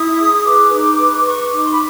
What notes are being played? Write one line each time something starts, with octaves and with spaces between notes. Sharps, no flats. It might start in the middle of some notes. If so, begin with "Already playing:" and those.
Already playing: E4 D#6
G#4
B4 D6
D#4
B4
B4 C#6
D#4 D6
C6
B5